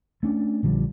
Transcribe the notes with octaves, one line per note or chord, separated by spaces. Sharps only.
A3 C#4 D4
A#1 D3 F3 G3